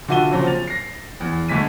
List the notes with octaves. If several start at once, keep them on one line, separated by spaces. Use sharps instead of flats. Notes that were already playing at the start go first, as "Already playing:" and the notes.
D3 F4 F#4 E5 D#7 G7
A#2 C#3 F3 F#3 C4
A6 F7
A#6 C7
E2
D2 G#3 B6 D#7